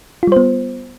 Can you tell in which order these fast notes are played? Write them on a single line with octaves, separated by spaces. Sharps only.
F4 G3 C5 B3